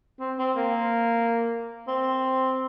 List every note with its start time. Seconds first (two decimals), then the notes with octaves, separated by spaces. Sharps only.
0.20 C4
0.39 C4
0.57 A#3
1.88 C4